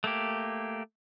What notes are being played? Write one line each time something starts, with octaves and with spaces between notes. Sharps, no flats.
A3 A#3 G4